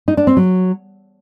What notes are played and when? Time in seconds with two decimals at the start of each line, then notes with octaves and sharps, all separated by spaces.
0.08 D#4
0.17 D4
0.27 C4
0.37 F#3